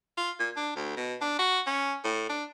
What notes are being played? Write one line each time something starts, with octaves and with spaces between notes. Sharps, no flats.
F4
A#2
D4
D2
B2
D4
F#4
C#4
A2
D4